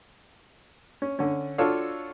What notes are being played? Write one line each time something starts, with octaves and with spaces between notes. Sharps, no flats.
C#4
D3 C#4
D4 F4 F#4 A4 C#5 F5